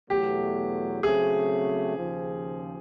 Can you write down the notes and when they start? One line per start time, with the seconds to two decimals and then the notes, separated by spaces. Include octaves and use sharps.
0.10 E2 B2 F#3 A3 G4
1.03 C#3 F#3 A3 C4 G#4
1.97 D#2 C#3 F3